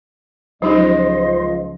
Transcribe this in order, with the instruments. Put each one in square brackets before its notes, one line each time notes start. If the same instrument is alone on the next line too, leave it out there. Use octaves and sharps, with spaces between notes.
[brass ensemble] C#2 F3 [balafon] F#3 D#4 G4 [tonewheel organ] C5 [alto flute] D#5